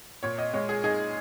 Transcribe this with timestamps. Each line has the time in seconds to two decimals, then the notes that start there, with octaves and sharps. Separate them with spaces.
0.23 A#2 C#5
0.38 D#5
0.53 G#3 C#5
0.69 G#4
0.84 D#4 G#4